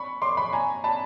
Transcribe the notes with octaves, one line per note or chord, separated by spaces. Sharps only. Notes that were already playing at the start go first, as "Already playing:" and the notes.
Already playing: B5 C#6
C6 D6
B5 C#6
G#5 A#5
A5 B5